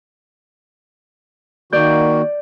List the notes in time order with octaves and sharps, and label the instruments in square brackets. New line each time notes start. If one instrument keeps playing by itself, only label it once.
[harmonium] D#3 A#3 F#4 [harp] D5 G6